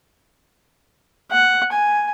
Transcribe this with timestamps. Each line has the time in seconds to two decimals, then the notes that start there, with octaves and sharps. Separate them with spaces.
1.31 F#5
1.71 G#5